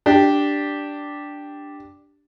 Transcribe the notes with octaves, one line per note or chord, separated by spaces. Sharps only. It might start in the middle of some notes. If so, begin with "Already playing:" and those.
D4 G4